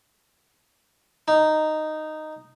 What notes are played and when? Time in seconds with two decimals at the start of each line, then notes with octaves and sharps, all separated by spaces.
1.28 D#4